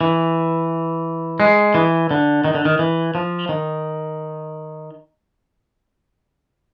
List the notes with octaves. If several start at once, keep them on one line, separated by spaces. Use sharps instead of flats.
E3
G#3
E3
D3
D#3
D3
D#3
E3
F3
D#3